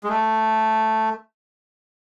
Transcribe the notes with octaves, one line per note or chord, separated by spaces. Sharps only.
G#3
A3